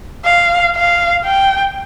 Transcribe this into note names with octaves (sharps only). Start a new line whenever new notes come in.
F5
F5
G5